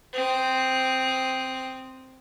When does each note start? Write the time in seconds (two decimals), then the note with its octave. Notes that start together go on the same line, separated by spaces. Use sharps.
0.13 C4 D#6